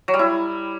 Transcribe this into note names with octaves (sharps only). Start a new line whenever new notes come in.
F#3
G3
E4